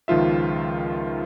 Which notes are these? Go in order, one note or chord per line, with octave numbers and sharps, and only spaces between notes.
C#2 D#3 F3 F4 E5